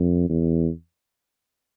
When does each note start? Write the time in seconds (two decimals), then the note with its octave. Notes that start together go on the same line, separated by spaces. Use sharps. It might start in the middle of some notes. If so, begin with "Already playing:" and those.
Already playing: F2
0.29 E2